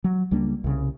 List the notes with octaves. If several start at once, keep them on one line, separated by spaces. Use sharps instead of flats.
F#3
C#2 G3 A#3 D4
C2 C#3